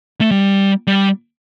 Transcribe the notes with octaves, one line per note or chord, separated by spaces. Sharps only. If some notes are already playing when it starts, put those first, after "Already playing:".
A3
G3
G3